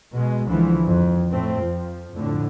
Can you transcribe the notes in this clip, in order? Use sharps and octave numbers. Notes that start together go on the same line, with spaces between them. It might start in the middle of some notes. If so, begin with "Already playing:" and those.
B2 G#3
C#2 D3 E3 F3 G#3
F2
A2 A3 C4
F2 F3
F2 A2 D3